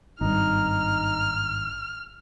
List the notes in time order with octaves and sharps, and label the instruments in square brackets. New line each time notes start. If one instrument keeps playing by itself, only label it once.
[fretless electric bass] G#1 G2 [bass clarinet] D#4 [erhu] F6